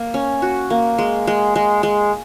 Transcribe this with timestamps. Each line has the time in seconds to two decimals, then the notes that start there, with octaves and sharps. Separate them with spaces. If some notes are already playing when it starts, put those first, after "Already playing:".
Already playing: A#3
0.14 C#4
0.42 F#4
0.70 A#3
0.98 G#3
1.27 G#3
1.56 G#3
1.83 G#3